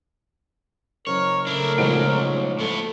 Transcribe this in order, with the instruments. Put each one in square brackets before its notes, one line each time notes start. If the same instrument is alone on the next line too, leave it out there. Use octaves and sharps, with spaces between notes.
[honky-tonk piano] F#1 [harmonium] A#4 [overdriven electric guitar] C#5
[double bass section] C#3 A3 [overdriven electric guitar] D4 E4
[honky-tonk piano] A#1 G#2 D7 [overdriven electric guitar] B2 F#3
[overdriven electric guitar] A2 B3 [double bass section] A3